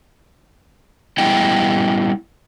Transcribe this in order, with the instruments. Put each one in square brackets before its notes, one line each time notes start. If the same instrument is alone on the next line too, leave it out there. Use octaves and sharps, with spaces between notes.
[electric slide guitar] G3 B3 E4 D#5 G5